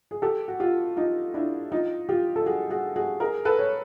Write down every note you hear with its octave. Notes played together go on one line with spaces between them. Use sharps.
G#4
G4 A4
F#4
F4 G4
D#4 F4
D4 E4
D#4 F4
F4 G4
A4
F#4 G#4
F#4 G#4
F#4 G#4
G#4 A#4
A4 B4
C#5